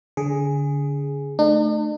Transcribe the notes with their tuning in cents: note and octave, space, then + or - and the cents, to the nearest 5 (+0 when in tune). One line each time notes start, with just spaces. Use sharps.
D3 -30 G#4 +0
A3 +0 D4 +45